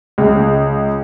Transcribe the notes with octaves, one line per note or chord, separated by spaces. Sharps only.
C#2